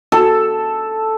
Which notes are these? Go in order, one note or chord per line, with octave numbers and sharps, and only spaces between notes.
A4